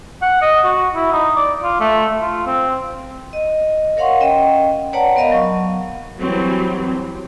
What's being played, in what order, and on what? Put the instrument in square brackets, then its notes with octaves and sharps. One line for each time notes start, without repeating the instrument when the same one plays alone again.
[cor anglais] F#5
D#5
F#4
E4
D#4
D5
F4
A3
F4
C4
[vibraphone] D#5
A#4 C#5 F5 F#5 C6 C#6
C#4 D#5 G5
B4 C#5 D5 F#5 A5 A#5
B3 A#4 D#5 F5
F#3 C#6
[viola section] E3 F#3 G3 C4